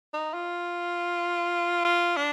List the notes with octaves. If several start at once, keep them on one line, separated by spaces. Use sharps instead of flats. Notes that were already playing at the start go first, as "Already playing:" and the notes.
D#4
F4
F4
D4